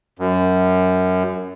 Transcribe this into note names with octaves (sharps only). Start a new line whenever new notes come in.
F#2